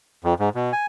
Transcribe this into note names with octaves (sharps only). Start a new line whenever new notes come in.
F2
G#2
B2
G#5